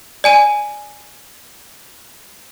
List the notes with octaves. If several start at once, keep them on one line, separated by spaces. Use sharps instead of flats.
D5 G#5 D#7